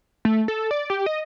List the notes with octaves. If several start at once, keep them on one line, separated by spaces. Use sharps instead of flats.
A3
A4
D5
G4
D#5